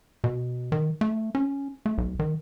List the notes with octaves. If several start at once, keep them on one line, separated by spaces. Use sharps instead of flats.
B2
D#3
A3
C#4
A3
B1
D#3